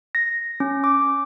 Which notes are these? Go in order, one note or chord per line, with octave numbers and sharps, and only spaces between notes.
A#6
C#4
D6